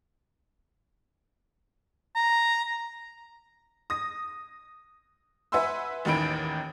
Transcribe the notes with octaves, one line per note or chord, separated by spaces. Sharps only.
A#5
D#6 A#6
B4 E5 F#5 G#5 C6 E6
A1 D#2 D#3 E3 B5 D7